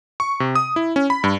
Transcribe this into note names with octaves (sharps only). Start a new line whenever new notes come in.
C#6
C3
D#6
E4
C#4
B5
G2